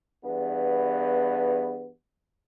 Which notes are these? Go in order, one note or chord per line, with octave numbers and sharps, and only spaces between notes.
E2 G2 B3